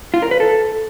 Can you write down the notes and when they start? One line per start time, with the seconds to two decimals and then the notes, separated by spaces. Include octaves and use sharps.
0.14 F4
0.22 A#4
0.31 B4
0.40 A4